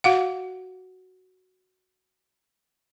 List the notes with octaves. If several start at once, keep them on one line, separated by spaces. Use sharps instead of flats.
F#4 F5 F#5